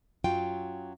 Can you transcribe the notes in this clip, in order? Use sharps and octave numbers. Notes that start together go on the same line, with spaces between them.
F#2 F#3 F4 G5